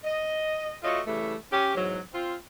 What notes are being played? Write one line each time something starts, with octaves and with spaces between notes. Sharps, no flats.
D#5
A3 F4 F#4 C#5 D#5
C#3 E3 G3 A3
C#4 G4
E2 G#2 F#3
C4 F4